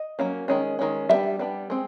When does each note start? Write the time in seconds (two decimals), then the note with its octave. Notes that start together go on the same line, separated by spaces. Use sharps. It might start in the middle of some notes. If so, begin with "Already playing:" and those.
Already playing: D#5
0.19 F#3 A#3 C#4
0.48 D#3 G#3 C#4
0.79 D#3 G#3 C#4
1.09 G3 B3 D4 E5
1.39 G3 B3 D4
1.70 G#3 C4